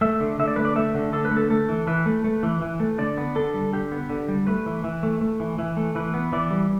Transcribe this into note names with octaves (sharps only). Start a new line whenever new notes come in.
A3 E5
D3
D3 E5
D5
A3 B4
D5
A3 E5
D3
D3 A4
B4
A3
A4
A3 A4
E3
E3 B4
A3
A3
E3
E3
A3
D3 D5
B3
D3 A4
G3
D3 G4
B3
D3
G3
A3 B4
E3
E3
A3
A3
E3
E3
A3
E3 B4
B3
E3 D5
G3